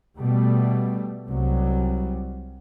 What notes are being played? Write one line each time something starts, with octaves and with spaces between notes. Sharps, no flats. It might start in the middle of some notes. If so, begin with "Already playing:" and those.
B2 G3 A3
C2 F#3 G3